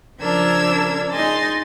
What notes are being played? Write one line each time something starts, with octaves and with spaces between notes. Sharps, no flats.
C#3 F3 D4 A#4 E6 G#6
D#4 G#4 D#5 G#5 C6 A6